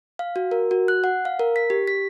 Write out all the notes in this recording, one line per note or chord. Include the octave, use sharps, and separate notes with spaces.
F5
F#4
A#4
F#4
F#6
F#5
F5
A#4
B6
G4
B6